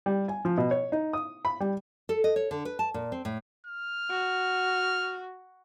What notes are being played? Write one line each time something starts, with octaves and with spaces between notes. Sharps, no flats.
G3
G#5
F3
B2
C#5
D#4
D#6
B5
G3
A4
D#5
C#5
D3
B4
A5
A#2
C4
A2
F6
F#4